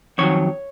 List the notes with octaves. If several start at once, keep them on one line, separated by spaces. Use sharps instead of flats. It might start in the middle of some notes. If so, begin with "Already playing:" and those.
F2 D#3 F#3 C#5